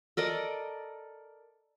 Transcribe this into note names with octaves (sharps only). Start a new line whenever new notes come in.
A4 A#4 D5 D#5